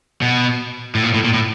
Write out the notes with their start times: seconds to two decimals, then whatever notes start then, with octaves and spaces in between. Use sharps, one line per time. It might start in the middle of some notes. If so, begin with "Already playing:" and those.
0.21 B2
0.95 A2
1.03 A#2
1.14 A2
1.24 A#2
1.34 A2